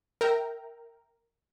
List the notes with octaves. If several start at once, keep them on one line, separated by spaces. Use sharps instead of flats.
A#4 E5 G5 A#5